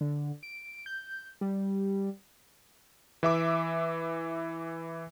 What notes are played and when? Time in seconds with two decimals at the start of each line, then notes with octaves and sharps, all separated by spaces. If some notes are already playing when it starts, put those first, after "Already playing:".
0.01 D3
0.43 D7
0.86 G6
1.41 G3
3.23 E3 E5 D6